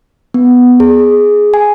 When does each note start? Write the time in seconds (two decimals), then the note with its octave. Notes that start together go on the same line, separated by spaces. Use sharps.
0.34 B3
0.80 G#4
1.54 G#5